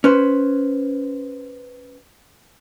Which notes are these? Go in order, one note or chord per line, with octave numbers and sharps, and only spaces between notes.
C#4 B4 C5